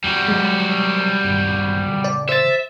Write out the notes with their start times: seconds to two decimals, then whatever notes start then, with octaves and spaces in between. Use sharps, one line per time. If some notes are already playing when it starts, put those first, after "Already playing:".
0.04 E2 G3 F#4
0.28 F#3 G#3
1.24 D1 A#1 G2
1.88 C#3 E3
2.04 D5
2.29 C5 E5 A6